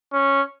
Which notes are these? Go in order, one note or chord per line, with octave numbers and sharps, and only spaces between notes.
C#4